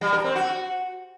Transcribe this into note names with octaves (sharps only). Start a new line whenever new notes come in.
G3
A#4
C4
F#4